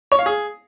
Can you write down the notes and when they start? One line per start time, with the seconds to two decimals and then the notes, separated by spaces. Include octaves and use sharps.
0.12 C#5
0.19 F5
0.26 G#4